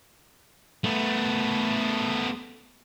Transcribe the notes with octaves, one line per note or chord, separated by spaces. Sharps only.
A3 B3